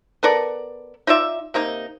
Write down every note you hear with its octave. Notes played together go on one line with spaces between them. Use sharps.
B3 A4 A#4 D5
D#4 F4 D5 E5
C3 A#3 D#4